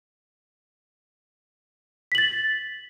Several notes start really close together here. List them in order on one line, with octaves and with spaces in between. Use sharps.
B6 F#7 A6